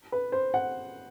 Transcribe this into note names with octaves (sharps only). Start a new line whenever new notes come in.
B4
C5
F#5